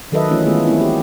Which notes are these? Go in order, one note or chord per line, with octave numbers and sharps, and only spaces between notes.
D#3 F#3 A4 B4 D#5 E5
E3 A3 C#4 F4
D#3 G#3 A3 B3 F4 G#4
A3 B3 C4 E4
G4